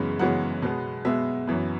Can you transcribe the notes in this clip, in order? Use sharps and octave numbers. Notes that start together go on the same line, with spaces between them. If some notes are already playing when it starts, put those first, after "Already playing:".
Already playing: F#2 C#3 E3 G#3 B3 B5
F#2 C#3 E3 G#3 B3 F#5
B2 G#3 B3
B2 G#3 B3 E5
F#2 E3 B3